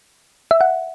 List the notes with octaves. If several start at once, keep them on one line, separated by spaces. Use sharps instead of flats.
E5
F#5